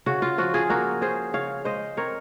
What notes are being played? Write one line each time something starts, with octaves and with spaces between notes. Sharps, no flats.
C#3 F#4
F4
F3 F#4
F4 G#4
A#3 F#4 A#4
C#4 G#4 C5
C#3 C#5 F5
G#3 C5 D#5
C4 A#4 C#5